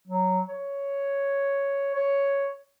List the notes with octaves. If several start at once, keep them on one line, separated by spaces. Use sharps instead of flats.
F#3
C#5
C#5